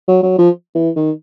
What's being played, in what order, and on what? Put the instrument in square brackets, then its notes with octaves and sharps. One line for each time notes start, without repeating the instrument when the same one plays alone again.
[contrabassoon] F#3
F#3
F3
E3
D#3